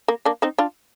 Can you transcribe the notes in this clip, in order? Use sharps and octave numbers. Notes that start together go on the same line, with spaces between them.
A#3
A#3 D4
C4 D#4
D4 F4